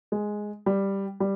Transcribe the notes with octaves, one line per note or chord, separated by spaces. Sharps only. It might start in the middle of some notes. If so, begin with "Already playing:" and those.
G#3
G3
G3